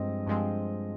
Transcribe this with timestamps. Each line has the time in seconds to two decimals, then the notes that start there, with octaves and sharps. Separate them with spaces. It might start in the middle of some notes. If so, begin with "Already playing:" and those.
Already playing: G2 F3 G#3 C4 D#5
0.27 G2 F3 G#3 C4